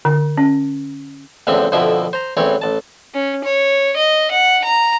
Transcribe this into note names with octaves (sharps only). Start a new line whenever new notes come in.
D3
C#4
A1 E2 D3 F3 C4 E5
F2 B2 D3 F3 E4 E5
C5 A#5
A1 E2 E3 C4 C#5
A1 A5
C#4
C#5
D#5
F#5
A#5